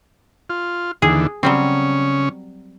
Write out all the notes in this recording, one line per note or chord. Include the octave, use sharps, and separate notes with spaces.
F4
D#2 D3 E3 G#4
C#3 F#3 G3 C4 C#4